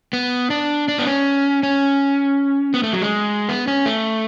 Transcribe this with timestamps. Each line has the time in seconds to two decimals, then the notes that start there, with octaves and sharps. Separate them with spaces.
0.13 B3
0.50 D4
0.88 D4
0.98 B3
1.07 C#4
1.63 C#4
2.74 B3
2.83 A3
2.93 F#3
3.02 G#3
3.49 B3
3.67 C#4
3.86 A3